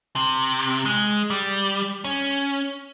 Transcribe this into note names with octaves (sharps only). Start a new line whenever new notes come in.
C3
G#3
G3
C#4